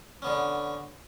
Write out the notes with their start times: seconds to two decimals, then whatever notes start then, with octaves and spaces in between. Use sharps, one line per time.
0.22 D3 B3 C#4